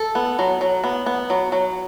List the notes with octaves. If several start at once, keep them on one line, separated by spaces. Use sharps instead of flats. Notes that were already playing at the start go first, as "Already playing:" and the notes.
Already playing: A4
B3
F#3
F#3
B3
B3
F#3
F#3